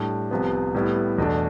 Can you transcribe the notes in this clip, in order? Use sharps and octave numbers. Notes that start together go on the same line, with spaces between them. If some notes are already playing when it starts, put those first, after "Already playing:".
Already playing: A2 G3 D4
C2 C3 F3 B3
A2 G3 B3 E4
E2 B2 A3 D4